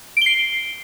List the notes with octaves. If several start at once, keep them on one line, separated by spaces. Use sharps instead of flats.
C7 D7 G7